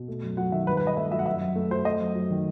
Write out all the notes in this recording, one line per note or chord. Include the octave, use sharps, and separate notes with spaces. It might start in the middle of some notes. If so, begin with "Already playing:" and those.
Already playing: B2
A3
F#2
F#3 F#5
D#3 E5
G2 B4
B4
G2 D#5
A3 E5
F#3 E5
F#5
F#2 E5
F#2
A3
F#3 C5
A3 D#5
F#2
F#3
D#3